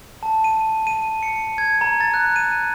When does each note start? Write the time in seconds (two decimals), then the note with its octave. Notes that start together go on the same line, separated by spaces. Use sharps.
0.23 A5
0.44 D#7
0.87 D#7
1.23 C#7
1.58 G#6
1.81 A#5
2.01 A6
2.14 F#6
2.36 D#7